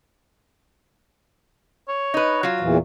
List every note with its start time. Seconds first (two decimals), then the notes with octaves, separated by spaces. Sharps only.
1.88 C#5
2.14 D#4 B4
2.43 F#3 F4
2.60 E2 A#2 E3